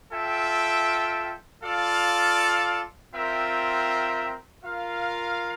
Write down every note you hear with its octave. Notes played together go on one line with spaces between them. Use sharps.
F4 A4 E5 G5
F4 A4 D5 F5
C4 F4 A#4 E5 G5
F4 A#4 F5